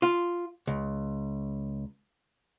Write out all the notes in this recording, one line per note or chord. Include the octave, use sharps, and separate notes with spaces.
F4
C#2